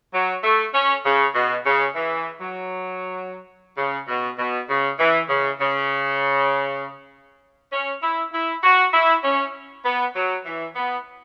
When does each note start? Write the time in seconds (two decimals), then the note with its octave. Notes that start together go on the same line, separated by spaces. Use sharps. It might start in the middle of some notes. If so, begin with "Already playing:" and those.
0.13 F#3
0.44 A3
0.74 C#4
1.05 C#3
1.35 B2
1.66 C#3
1.95 E3
2.41 F#3
3.77 C#3
4.08 B2
4.39 B2
4.69 C#3
4.99 E3
5.29 C#3
5.60 C#3
7.72 C#4
8.02 E4
8.33 E4
8.63 F#4
8.93 E4
9.24 C#4
9.84 B3
10.15 F#3
10.45 E3
10.76 B3